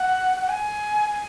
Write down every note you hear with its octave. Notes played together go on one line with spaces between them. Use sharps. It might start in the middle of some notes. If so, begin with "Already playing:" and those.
Already playing: F#5
F#5
G#5
G#5